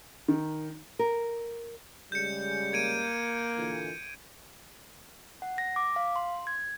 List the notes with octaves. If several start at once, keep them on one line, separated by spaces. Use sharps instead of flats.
D#3
A#4
C#3 G3 G#3 G6 C#7
A#3 G#6 D7 D#7
A#2 D3 E3
F#5
A#6
D6
F5
C6
G#6